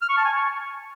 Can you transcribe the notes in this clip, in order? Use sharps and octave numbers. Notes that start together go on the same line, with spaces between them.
F6
C#6
A5
G#5
C#6